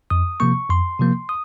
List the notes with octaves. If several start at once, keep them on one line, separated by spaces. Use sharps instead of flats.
F2 D#6
C3 F3 A#3 C#6
F2 C6
C3 F3 A#3
D#6